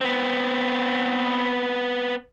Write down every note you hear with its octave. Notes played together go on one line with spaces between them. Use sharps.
B3 C4